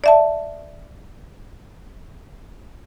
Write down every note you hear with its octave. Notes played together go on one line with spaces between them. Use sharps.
D5 E5 A5